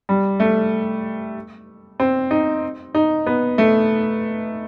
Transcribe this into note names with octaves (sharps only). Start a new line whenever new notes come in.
G3
A3
C4
D#4
D#4
B3
A3